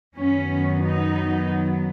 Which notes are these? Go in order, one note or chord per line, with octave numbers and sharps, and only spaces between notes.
F#2 D#3 F#3 B3 C#4
D#4